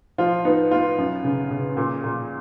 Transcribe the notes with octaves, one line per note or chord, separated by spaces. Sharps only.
F3 F4
B3 D#4
B3 F4
F#2
C#3
C#3
A#2
A#2